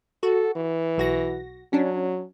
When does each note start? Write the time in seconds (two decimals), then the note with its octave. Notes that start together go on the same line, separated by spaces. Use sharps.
0.23 F#4 A4
0.55 E3
0.98 B1 F#4 A#6
1.73 F#3 C#4 D4